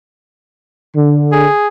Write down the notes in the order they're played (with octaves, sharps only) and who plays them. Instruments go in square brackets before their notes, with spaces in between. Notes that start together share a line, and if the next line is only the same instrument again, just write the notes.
[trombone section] D3
[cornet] G#4